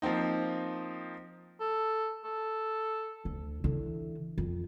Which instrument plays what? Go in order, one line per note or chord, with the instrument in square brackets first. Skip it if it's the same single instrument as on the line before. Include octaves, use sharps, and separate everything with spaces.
[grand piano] F3 A#3 C4 D#4
[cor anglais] A4
A4
[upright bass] D2
D3 E3
F2